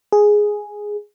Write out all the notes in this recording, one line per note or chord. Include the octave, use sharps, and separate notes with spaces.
G#4